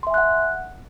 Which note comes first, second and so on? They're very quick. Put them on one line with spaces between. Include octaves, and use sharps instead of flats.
C6 E5 G#5 F#6 F#5